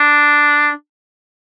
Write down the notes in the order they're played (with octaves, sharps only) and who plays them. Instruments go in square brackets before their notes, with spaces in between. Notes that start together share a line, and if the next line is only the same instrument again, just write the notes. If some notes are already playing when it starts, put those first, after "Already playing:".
Already playing: [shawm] D4